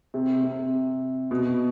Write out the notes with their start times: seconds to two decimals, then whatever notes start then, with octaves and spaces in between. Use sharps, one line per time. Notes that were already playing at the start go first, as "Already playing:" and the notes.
0.14 C3
0.43 C3
1.31 B2